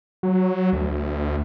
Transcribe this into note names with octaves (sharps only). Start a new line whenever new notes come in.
F#3
D2